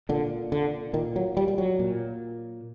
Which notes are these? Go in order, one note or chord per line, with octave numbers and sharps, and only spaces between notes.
A#2 D3
D3
A#2 D#3
F#3
G3
G3
F#3
A#2